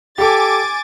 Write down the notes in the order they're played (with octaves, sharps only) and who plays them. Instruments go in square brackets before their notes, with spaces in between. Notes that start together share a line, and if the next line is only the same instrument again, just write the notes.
[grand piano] G4 A4 [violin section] G#5 D6 A6